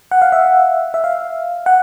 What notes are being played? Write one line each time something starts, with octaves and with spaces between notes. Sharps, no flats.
F#5
F5
E5
E5
F5
F#5